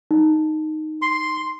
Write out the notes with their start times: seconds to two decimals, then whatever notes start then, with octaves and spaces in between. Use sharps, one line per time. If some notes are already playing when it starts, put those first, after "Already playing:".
0.11 D#4
1.02 C6